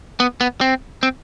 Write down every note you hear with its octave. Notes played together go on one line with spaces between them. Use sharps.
B3
B3
C4
C4